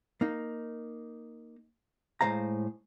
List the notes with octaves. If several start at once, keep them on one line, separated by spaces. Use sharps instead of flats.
A#3 D#4
A2 G#3 C5 F5 A#5